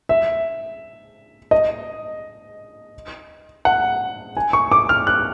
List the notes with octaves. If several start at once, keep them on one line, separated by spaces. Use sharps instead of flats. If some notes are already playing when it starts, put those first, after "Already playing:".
E5
D#5
F#5
G#5
C#6
D6
F6
F#6